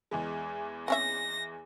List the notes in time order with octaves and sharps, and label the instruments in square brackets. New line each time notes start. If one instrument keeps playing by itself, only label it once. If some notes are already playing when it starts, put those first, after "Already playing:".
[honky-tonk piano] E2 E3 G#3
[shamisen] C4 C#4 E5 [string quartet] A#6